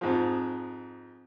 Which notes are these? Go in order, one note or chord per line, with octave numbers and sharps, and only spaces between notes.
F2 G#2 F3